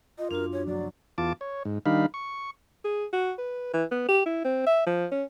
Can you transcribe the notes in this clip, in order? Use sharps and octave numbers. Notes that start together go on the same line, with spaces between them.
F4 D#5
F#2 D4 F#4 A#4
C#5
G1 F#2 F3 F#3 D5
E2 F4 A5 D6
C#5
G#2
D#3 G3 D4 D#4 F5 B5
C#6
G#4
F#4
B4
E3
B3
G4
E4
C4
E5
F3
C#4